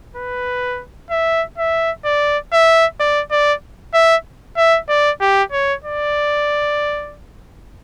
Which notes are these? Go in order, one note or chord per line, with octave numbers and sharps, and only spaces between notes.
B4
E5
E5
D5
E5
D5
D5
E5
E5
D5
G4
C#5
D5